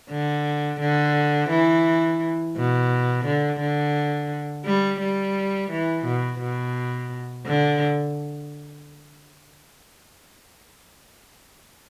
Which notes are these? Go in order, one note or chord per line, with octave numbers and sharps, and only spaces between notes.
D3
D3
E3
B2
D3
D3
G3
G3
E3
B2
B2
D3